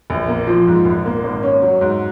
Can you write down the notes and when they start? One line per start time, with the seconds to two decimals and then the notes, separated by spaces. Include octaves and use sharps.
0.10 A#1
0.28 A#3
0.47 F3
0.67 G#2
0.85 A#1
1.06 A#3
1.23 G#1
1.43 C#4
1.62 F#3
1.81 G#2